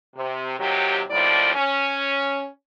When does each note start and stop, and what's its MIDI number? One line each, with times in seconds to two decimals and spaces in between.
0.16 0.57 48
0.58 1.02 39
0.58 1.02 48
0.58 1.02 54
0.58 1.02 67
1.10 1.51 39
1.10 1.51 45
1.10 1.51 53
1.10 1.51 74
1.54 2.47 61